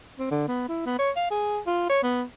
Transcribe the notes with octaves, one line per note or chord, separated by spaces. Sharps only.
C4
D3
B3
E4
B3
C#5
F5
G#4
F4
C#5
B3